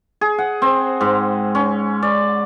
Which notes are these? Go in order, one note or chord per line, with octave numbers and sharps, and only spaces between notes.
G#4
F#5
C4
G#2
C#4
D5